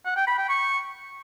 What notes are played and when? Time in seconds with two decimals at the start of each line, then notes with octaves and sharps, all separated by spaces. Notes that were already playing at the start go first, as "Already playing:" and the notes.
0.05 F#5
0.16 G5
0.27 B5
0.38 G5
0.49 C#6